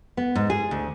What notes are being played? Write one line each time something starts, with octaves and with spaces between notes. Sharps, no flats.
B3
G#2
G#4
D2